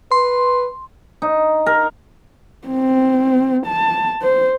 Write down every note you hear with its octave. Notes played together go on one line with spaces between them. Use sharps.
B4 C6
D#4
A#4
C4
A5
C5